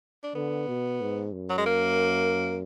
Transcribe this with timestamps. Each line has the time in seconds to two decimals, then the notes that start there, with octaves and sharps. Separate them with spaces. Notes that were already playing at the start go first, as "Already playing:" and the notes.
0.24 D4
0.35 D3 B3
0.68 B2
1.01 G#2
1.33 F#2
1.50 F#3
1.58 G#3
1.66 A#3